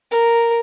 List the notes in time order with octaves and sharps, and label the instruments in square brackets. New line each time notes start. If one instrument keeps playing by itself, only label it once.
[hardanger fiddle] A#4